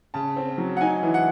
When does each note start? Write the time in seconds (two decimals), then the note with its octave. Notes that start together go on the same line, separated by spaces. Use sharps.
0.14 C#3 A5
0.37 C4
0.58 F#3
0.77 F#5
0.81 D#4 G#5
1.03 E3
1.14 F#5